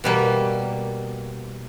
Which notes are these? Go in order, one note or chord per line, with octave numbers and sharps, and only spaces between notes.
B2 G3 A#3